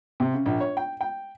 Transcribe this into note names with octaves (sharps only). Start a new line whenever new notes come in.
C3
C#3
A#1
C#5
G5
G5